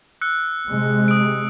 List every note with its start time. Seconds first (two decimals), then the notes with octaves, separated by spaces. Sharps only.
0.21 E6 F#6 C#7
0.67 C3 G#3
1.08 D#6 D7